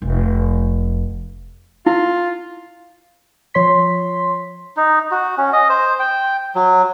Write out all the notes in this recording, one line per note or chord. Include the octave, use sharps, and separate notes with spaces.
F1
E4 F4
F3 C#5 C6 B6
D#4
F#4
C#4
D#5
C5
G5
F#3